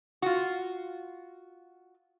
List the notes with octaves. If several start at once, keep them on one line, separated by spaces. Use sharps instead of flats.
F4 F#4